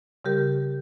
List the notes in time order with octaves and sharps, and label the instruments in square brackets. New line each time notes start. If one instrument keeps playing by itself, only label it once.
[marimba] C#3 G3 G4 A#4